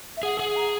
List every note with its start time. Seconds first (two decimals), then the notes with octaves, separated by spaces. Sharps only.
0.17 E5
0.23 G#4 F#5
0.39 G#4 F#5
0.56 A#5